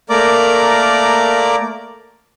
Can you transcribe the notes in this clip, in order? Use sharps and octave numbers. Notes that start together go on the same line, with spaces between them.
A3 A#3 A#4 D5 A#5 D6